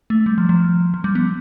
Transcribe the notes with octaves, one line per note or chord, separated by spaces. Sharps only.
A3
G3
F3
F3
F3
G3
B3